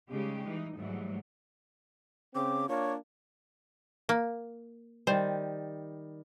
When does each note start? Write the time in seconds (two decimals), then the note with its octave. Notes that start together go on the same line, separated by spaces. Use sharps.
0.10 C#3 G3 G#3 D#4 G4
0.45 E3 D#4
0.77 G#2 E3 F#3 G3 A3
2.35 C#3 C4 D6
2.69 A#3 D4 F4 C#5
4.09 A#3
5.07 D#3 G3 C5